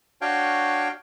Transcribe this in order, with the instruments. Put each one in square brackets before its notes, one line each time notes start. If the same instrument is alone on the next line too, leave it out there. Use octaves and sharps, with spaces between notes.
[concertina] D4 F#4 C#5 F5 G5